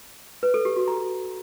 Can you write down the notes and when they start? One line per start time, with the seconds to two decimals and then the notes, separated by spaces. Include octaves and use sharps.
0.43 B4
0.54 A4
0.65 G4
0.76 F#4
0.88 A#5